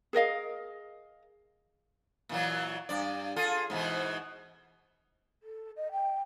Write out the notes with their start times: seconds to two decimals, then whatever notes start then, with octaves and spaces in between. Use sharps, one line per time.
0.13 G#4 A#4 D#5 F5
2.29 A#2 E3 F#3
2.89 G2 D5
3.36 F4 G#4 A4
3.70 G#2 B2 E3
5.43 A4
5.77 D#5
5.92 G5